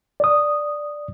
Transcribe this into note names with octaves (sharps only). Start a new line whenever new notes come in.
D5 D#6